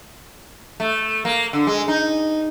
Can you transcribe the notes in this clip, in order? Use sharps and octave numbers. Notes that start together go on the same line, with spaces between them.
A3
A#3
D3
G#3
D#4